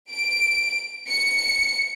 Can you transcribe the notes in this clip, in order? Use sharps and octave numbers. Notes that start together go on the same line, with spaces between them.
D7
C#7